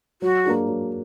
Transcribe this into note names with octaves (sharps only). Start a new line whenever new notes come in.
F#3 F#4
A#3 D4 G#4
F#3